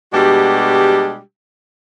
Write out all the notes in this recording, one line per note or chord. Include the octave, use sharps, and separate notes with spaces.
B2 G3 G#3 D4 F#4 G4